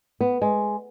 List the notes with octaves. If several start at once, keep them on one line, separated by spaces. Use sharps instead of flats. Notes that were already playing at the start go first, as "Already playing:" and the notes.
B3
G#3